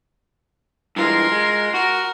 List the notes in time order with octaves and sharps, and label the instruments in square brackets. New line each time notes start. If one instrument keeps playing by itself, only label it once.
[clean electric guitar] G2 E3 G#3 [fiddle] F4 A#4
[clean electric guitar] G#3
[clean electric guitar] F#4 [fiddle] A#4